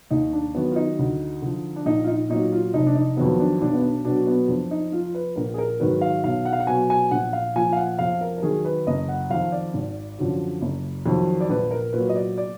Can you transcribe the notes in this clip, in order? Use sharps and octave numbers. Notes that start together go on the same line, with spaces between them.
D#2 D#4
D4
D#3 F#3 B3
F4
D#4
D2
D3 F3
D4
A#1 D#4
F4
D#4
A#2 F#3 D#4
F4
F1 D#4
D4
D#4
F2 D#3 F#3 B3
D4
B1 D4
B3
D4
B2 F#3 D4
B3
F2 D4
D#4
F3 F4
B4
A#1 A#4
G#4
A#4
G#2 D#3 F#3 B4
F5
B1 F5
F#5
F5
F#5
B2 F#3 G#5
G#5
A#1 F#5
F5
A#2 F3 G#5
F5
F#5
F2 F5
A#4
A#4
D#3 F#3 G#4
B4
F#1 D#5
F#5
F2 D#3 F5
D5
G#1
F#2 D3 F3
F#1
F2 D#3 F#3
D5
A#1 B4
A#4
A#2 F#3 B4
D#5
D5
D5